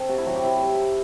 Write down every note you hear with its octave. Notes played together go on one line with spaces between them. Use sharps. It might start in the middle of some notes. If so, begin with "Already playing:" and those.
Already playing: C4 A4
C3 F#4
E4
F#3 F#4
G4
C3 E4